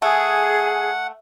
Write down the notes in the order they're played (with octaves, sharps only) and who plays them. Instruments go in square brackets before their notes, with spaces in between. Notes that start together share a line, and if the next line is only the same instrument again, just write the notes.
[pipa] A3 [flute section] G#4 [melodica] F#5